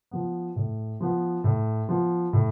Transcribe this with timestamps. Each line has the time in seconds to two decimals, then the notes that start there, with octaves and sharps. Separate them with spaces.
0.11 F3 B3
0.56 A2
1.01 F3 B3
1.44 A2
1.89 F3 B3
2.33 A2